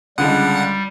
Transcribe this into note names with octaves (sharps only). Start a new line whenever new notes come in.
C#2 D3 G3 G#3 F#5